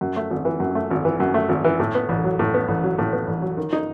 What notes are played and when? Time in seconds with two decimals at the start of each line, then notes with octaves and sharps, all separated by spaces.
0.01 F#2
0.16 A3
0.30 G#1
0.45 E3
0.60 F#2
0.75 A3
0.91 G#1
1.05 E3
1.20 F#2
1.34 A3
1.49 G#1
1.64 E3
1.80 A2
1.95 B3
2.09 A1
2.24 F#3
2.39 A2
2.54 B3
2.68 A1
2.84 F#3
2.99 A2
3.13 B3
3.27 A1
3.42 F#3
3.57 D#3
3.73 D#4